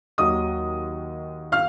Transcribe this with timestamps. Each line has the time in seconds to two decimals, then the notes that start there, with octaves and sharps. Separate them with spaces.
0.18 D#2 D#3 F#3 D#5 D#6
1.52 F5 F6